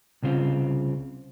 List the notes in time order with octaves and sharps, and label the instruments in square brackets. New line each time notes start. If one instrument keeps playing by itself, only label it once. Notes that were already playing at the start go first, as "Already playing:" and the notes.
[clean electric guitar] C2 C#3 C4 F4